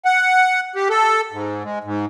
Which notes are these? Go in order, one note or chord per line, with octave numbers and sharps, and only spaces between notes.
F#5
G4
A4
G#2
G#3
G#2